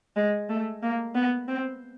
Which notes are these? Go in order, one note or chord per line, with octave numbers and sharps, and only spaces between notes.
G#3
A3
A#3
B3
C4